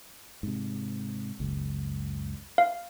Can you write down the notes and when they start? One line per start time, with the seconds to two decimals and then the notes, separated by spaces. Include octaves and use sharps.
0.43 G#2 C3
1.40 F#1 C#2
2.58 F5